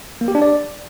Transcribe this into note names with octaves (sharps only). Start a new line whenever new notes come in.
A#3
G4
D4
D5